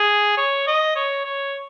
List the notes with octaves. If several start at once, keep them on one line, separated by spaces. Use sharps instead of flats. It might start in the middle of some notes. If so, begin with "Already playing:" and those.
Already playing: G#4
C#5
D#5
C#5
C#5